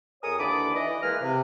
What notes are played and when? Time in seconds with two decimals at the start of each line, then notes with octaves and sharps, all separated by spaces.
0.23 F2 G#4 A#4 C#5 D#6
0.40 D#2 D3 E3 D5 B5 D6
0.75 E3 D#5
1.03 E3 G#3 A#3 E4 B4 F6
1.22 C3